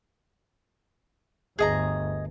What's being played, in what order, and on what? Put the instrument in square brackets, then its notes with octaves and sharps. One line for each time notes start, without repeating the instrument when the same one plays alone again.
[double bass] G1 D2 [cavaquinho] G#4 D#5 A#5